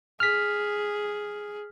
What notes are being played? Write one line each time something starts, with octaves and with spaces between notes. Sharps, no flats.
G#4 F6 B6